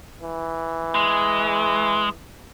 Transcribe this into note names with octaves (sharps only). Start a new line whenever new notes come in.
E3
G#3